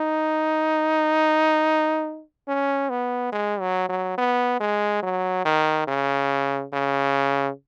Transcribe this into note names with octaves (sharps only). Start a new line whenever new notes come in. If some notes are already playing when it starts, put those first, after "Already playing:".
Already playing: D#4
C#4
B3
G#3
F#3
F#3
B3
G#3
F#3
D#3
C#3
C#3